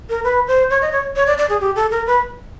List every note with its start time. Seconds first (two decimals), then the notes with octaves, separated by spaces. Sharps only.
0.09 A#4
0.24 B4
0.48 C5
0.70 C#5
0.82 D#5
0.92 C#5
1.16 C#5
1.26 D5
1.38 D5
1.50 G#4
1.61 G4
1.76 A4
1.91 A#4
2.07 B4